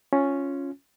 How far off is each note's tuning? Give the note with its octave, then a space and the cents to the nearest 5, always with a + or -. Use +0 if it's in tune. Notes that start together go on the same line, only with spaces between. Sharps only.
C#4 +0 F4 +0